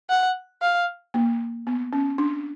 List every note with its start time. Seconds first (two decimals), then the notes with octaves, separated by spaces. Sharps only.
0.10 F#5
0.62 F5
1.14 A#3
1.67 B3
1.93 C#4
2.18 D4